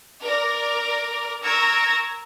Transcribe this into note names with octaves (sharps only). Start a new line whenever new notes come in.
A#4 D5
A#4 A#5 C#6 E6 G#6 A#6